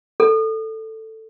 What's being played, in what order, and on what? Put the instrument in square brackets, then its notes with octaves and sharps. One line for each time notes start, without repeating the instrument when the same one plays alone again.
[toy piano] A4